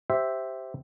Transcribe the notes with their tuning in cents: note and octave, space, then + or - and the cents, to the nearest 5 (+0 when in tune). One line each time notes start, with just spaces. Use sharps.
G4 -10 C5 +0 E5 +0